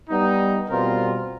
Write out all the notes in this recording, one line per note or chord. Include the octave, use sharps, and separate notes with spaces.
G3 B3 D#4
B2 G3 C4 F4 A#4